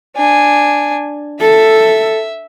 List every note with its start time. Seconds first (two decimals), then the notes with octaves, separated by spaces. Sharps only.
0.16 D4 G#5
1.40 A4 E5